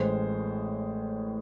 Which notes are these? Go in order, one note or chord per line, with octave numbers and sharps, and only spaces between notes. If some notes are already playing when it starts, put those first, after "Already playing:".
Already playing: A1 A2 G#3 C5